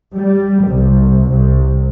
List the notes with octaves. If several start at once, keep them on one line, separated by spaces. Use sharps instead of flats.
G3
C2
C2